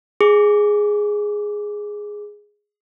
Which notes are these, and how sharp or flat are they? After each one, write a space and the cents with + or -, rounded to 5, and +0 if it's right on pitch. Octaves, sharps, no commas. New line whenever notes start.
G#4 +0 D6 -5